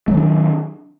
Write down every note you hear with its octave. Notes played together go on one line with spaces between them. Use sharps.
D#3 F#3 A3 D4